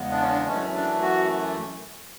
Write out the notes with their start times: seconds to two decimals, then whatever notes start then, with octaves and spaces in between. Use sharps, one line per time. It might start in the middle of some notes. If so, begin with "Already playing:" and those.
Already playing: E2 C#3 G#3 B3
0.11 D4
0.21 C#4
0.30 D4
0.47 F#2 E3 A3 C#4
0.74 D4
1.02 F#4